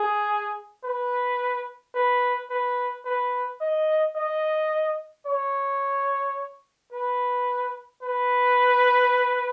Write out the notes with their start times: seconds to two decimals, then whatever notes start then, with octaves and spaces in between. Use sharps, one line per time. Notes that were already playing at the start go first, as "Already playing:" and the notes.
Already playing: G#4
0.84 B4
1.95 B4
2.50 B4
3.05 B4
3.61 D#5
4.16 D#5
5.26 C#5
6.92 B4
8.03 B4